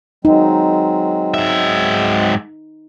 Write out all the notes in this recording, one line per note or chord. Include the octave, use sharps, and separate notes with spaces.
F#3 G#3 C4 D#4
G#2 E5